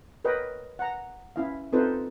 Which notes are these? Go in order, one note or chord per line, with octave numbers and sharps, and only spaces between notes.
A#4 B4 C#5 D#5 G5
F#5 A#5
C#4 E4 F5
C4 D#4 F4 A4 B4 C5